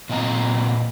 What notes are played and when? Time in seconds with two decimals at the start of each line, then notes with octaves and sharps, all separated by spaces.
0.09 A#2 C4 D#5 G#5 A#5